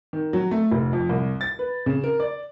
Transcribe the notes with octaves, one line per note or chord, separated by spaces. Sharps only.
D#3
F#3
A3
F1
F2
C2
A6
B4
C#3
A#4
D5